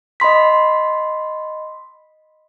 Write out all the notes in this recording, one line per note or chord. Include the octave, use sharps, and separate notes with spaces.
D#5 B5 C6 B6